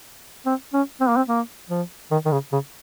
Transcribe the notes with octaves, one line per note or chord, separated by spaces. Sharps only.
C4
C#4
C4
A#3
C4
A#3
F3
D#3
D#3
C#3
C#3